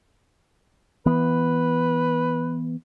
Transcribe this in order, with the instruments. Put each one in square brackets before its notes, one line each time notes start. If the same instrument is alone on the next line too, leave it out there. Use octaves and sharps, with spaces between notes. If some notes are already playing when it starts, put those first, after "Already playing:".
[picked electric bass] E3 B3 [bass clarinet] B4